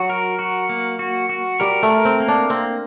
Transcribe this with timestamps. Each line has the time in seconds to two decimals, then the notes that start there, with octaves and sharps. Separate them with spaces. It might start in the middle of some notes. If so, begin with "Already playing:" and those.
Already playing: F#3 F#4
0.10 A#4
0.39 F#4
0.69 A#3
0.99 F#4
1.29 F#4
1.60 G3 A#4
1.83 A3
1.90 A#4
2.05 C4
2.20 A#3
2.28 D4
2.50 A#3 C4